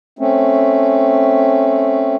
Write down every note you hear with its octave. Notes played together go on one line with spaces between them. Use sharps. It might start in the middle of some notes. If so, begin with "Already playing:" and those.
A3 C4 C#4